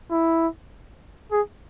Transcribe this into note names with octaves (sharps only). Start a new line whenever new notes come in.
E4
G#4